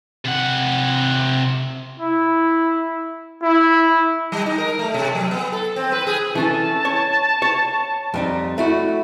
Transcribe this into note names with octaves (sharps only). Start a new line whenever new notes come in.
C3 F#5
E4
E4
G3
D#4
A#4
A3
C3
F#3
B3
A4
C4
B4
G#4
E3 C#4 A4 A5
C#5
C#5
F2 G3 D#4
A3 E4 F#4